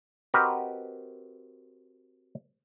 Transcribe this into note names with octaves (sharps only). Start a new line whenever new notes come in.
C4 F#4 G4 A#4 B4 D#5